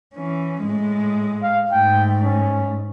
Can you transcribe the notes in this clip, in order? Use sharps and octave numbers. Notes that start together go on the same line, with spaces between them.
E3 C#4
A2 G#3
F5
G#2 A3 G5
C#4